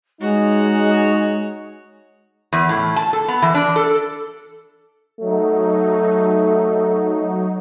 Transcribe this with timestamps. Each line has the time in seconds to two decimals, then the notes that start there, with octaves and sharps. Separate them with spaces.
0.21 G#3 D#4 F#4 C#5
2.53 E2
2.69 A2
2.96 A5
3.13 A4
3.28 B3
3.42 E3
3.54 D4
3.76 A4
5.20 F#3 A3 D#4